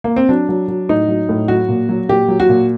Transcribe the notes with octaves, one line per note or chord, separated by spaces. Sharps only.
A#3
C4
F#3 D4
F#3
F#3
A2 D#4
F#3
A2
F#3 F#4
A#2
F#3
A#2 G4
F#3
F#4
A#2